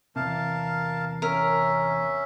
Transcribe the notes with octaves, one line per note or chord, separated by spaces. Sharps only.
E2 G2 C3 A#4 F5 A5
C#4 A#4 E5